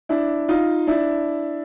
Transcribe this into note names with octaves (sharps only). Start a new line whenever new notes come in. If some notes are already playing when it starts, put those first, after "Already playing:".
D4 E4
D#4 F4
D4 E4